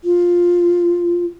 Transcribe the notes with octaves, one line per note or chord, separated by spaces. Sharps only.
F4